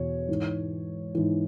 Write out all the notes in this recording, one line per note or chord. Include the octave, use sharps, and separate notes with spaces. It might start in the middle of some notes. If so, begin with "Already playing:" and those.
Already playing: E2 B2 C#5
G#2 E3
G#2 E3